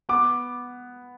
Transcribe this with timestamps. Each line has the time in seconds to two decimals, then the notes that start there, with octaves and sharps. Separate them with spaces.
0.09 B3 D6